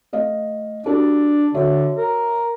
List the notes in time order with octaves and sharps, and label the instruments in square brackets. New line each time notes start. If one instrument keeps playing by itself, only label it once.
[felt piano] A3 D#5 F5
[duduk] D4 [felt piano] F#4 G4 A4
[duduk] D3 [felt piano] F#4 C#5 E5
[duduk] A#4